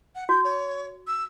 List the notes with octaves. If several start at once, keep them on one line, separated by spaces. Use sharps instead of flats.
F#5
F#4 G6
C#5
E6